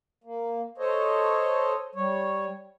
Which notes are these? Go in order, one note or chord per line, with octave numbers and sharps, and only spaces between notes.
A#3
A4 C5 C#5 D#5
G3 C#5